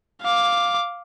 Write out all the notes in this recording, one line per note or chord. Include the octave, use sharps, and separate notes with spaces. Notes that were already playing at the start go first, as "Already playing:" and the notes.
F5 D6